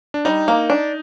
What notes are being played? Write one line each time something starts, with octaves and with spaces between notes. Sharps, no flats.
D4
G3 D#4
A#3
D4